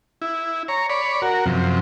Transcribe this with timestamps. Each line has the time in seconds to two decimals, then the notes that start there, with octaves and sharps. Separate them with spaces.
0.22 E4
0.68 C#5 A#5
0.89 C#5 D5 B5
1.22 F#4 A#4
1.46 F#2 C3 F3